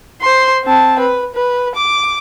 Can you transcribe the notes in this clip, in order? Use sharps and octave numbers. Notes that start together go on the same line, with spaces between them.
C5 C6
C4 A5
B4
B4
D6